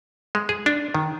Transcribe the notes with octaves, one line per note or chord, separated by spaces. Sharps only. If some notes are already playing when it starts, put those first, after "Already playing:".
G#3
G#4
D4
D#3